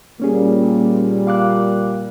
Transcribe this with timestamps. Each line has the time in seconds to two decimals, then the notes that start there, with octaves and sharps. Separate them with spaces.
0.20 A#2 G3 A#3 C#4 G#4
1.27 F5 D6 F#6